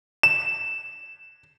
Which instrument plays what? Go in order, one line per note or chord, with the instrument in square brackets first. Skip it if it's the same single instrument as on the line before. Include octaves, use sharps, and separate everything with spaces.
[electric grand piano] E7